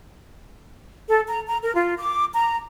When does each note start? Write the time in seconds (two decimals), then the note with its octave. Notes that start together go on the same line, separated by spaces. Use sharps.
1.08 A4
1.28 A#5
1.47 A#5
1.63 A#4
1.74 F4
1.98 D6
2.34 A#5